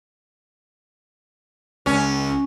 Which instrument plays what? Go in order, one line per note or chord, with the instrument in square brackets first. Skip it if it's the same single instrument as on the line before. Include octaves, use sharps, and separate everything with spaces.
[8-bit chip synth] C#2 [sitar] C#4